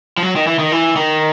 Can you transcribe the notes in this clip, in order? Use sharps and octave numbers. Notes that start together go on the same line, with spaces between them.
F3
F#3
D#3
E3
D#3
E3
D#3